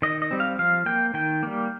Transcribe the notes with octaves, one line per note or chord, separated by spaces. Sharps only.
D#3 D#5
D#5
G3 C4
F5
F3 F5
A#3 G5
D#3 G5
G3 A#3